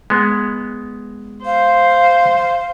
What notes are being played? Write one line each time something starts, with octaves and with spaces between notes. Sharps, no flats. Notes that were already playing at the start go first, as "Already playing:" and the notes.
G#3 B3
C5 F5